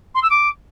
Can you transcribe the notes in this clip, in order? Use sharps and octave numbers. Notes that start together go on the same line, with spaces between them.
C6
E6
D6